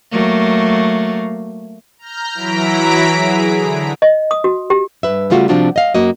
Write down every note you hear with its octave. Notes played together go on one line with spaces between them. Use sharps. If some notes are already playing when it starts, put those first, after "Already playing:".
F#3 A3 A#3
A#5 F6 G6
E3 F#3 E4 A#5 B6 D7
G#4
D3
D#5
D#6
F#4
G4
G2 B4 E5
C#3 G3 A3 F4 F#4
C3 F3 C4 D4 F4 F#4
D#5 F5
F#2 A#3 F#4 D#5